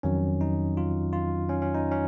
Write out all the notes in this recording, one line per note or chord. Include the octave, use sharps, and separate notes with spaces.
F2 D#3 F#3 C#4
D#4
F4
F4
C#4
C#4
D#4
C#4